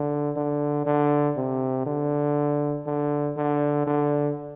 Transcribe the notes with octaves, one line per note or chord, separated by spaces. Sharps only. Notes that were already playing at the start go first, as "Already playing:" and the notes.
Already playing: D3
D3
D3
C3
D3
D3
D3
D3